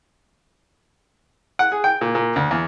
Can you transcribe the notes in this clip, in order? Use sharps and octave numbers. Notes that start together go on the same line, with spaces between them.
F#5
G#4
G5
A#2
A#2
D2
E2